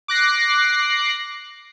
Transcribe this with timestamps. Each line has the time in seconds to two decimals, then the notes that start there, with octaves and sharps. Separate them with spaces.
0.08 D6 F#6 A#6 C7